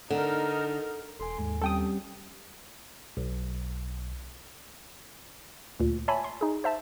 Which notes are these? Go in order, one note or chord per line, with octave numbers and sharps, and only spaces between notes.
D3 D#4 A#4
E1 A4 G#5 C6
D#2 G#2
G3 C4 C#4 G4 A4 G5 D#6
B1
D2 A#2
C#5 E5 G#5 A5 B5
C6
D#4 G#4
C5 E5 A5